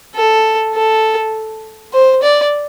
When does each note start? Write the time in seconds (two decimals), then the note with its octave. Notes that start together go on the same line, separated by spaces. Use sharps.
0.15 A4
0.74 A4
1.93 C5
2.22 D5